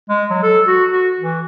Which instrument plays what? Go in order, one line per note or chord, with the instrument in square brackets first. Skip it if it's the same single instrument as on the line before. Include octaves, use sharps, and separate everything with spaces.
[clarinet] G#3
F#3
A4
F#4
F#4
E3